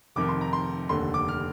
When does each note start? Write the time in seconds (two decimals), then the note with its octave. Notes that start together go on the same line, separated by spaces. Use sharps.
0.16 F1 F2 D#3 D6
0.29 C6
0.41 A#5
0.53 C6
0.89 F1 D#2 D3 C6
1.14 D6
1.28 F6